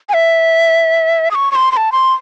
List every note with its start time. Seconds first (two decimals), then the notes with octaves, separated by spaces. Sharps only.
0.09 G#5
0.14 E5
1.31 D#6
1.35 C#6
1.52 C#6
1.55 C6
1.72 C6
1.77 A5
1.92 C6